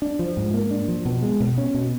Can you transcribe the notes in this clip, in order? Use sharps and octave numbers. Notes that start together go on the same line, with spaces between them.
D4
F3
G#2
A#3
D4
F3
B2
G#3
B2
C#4
B2